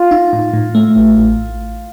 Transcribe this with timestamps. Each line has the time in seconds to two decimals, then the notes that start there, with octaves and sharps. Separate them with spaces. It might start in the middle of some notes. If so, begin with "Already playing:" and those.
Already playing: F4
0.11 D#4
0.33 A2
0.54 A2
0.75 A3
0.97 A1
1.18 A1